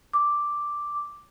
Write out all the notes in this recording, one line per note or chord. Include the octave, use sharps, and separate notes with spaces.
D6